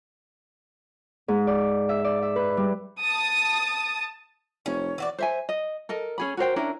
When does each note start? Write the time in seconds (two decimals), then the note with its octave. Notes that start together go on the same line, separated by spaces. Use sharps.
1.28 G#2
1.47 D5
1.89 E5
2.04 D5
2.22 E5
2.36 B4
2.57 G3
3.00 A5 D#6
4.66 F1 C#4 C#5
4.98 E3 F#4 D5
5.19 C5 E5 G#5
5.49 D#5
5.89 A4 A#4 D#5
6.18 C#4 G#4 B5
6.37 F#4 A#4 C5 G5
6.56 C#4 D4 E4 A#4